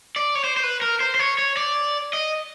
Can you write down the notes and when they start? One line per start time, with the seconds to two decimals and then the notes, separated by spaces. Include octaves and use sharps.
0.16 D5
0.35 C#5
0.44 C5
0.57 C5
0.63 B4
0.82 A#4
1.00 C5
1.15 C5
1.19 C#5
1.38 C#5
1.57 D5
2.13 D#5